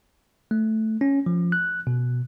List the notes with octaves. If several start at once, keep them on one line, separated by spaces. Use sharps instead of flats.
A3
C#4
F3
F#6
B2